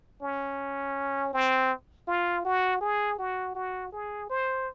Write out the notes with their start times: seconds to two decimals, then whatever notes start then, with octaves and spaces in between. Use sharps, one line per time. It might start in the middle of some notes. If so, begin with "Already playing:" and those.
0.22 C#4
1.33 C4
2.08 F4
2.45 F#4
2.81 G#4
3.19 F#4
3.55 F#4
3.92 G#4
4.30 C5